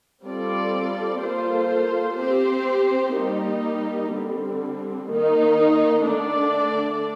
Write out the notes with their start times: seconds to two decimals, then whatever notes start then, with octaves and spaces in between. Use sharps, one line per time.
0.25 G3 C4 F4 A4 D5
1.22 A#3 F4 A4 C5
2.19 C4 G4 C5
3.16 G3 A#3 D#4 G4
4.13 D3 G3 C4
5.09 D#3 A#3 D#4
6.06 D3 A3 D4 A4 D5